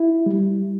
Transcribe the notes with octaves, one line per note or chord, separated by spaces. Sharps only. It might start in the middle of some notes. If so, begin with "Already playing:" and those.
Already playing: E4
G3